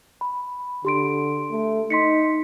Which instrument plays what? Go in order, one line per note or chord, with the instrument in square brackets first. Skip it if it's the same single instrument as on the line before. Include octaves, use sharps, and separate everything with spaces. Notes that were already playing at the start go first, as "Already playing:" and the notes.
[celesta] B5
[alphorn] D3 [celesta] G4 C6 D7
[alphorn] A3
[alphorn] D#4 [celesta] C6 B6 C#7